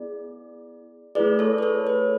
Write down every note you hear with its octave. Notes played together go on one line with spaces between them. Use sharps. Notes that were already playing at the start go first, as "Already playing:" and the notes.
Already playing: B3 E4 G#4 D5
A3 E4 G#4 B4 D5
A4 C#5
B4
A4 C#5
B4